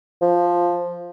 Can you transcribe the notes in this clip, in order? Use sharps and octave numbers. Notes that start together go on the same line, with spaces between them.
F3